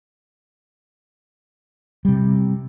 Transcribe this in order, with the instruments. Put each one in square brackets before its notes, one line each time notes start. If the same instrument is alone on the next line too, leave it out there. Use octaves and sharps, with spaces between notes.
[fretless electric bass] C3 G3